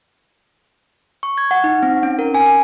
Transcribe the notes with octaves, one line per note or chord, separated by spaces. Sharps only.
C#6
G#6
F#5
D#4
C4
C#4
A#4
G#5
G#5